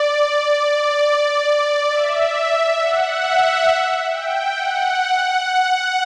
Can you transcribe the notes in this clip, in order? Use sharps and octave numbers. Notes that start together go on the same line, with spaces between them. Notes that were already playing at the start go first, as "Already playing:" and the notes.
Already playing: D5
D5
E5
F#5
E5
G5
F#5
F#5